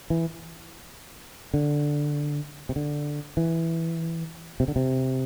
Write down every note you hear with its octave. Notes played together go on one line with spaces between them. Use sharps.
E3
D3
C3
D3
E3
C3
D3
C3